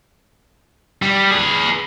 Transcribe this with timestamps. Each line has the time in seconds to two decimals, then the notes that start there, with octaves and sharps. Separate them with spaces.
1.02 G3
1.31 G#4 B4